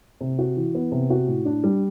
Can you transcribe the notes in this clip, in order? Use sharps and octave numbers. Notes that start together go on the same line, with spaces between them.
C3
F#4
E3
B3
C3
F#4
A2
D4
G3